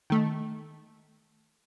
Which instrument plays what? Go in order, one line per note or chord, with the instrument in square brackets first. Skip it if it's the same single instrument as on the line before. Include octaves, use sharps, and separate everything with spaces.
[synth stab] D#3 A3